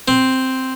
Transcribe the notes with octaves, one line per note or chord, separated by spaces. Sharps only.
C4